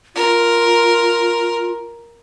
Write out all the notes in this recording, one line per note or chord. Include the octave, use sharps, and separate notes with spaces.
F4 A#4